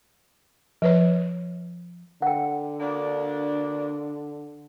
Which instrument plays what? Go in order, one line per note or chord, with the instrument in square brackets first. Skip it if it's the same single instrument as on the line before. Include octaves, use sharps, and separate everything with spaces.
[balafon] F3 B4 C#5
[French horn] D3 [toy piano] F#5 G5
[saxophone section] D2 A#3 D4